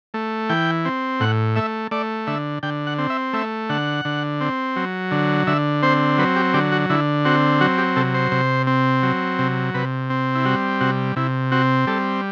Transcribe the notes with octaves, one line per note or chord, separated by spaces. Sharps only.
A3
E3 G5
C4
A2 F#5
A3 E5
A3 D5
D3 E5
D3 G5
F#5
C4
E5
A3 E5
D3 F#5
D3
C4
F#3
D3
D3 E5
C4 C5
F#3 B4
G4
D3 G4
F#4
D3 E4
C4 F#4
F#3 F#4
G4
C3 A4
C5
C3
C4
F#3
C3
C3 B4
C4
E4
G3 F#4
C3 F#4
C3 E4
C4 F#4
G3 A4